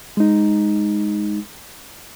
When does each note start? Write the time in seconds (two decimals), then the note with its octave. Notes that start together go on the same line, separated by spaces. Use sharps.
0.17 G#3 D#4